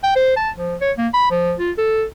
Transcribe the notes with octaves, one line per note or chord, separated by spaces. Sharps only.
G5
C5
A5
F3
C#5
A#3
B5
F3
F4
A4